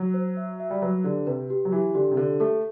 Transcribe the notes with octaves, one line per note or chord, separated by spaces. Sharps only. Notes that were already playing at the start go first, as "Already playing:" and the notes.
Already playing: F#3
C5
E5
E5
G3
F#3 B4
D3 G4
C3 B4
G4
F#3
E3 G4
D3 G4
C3
D3 A4
A3 A4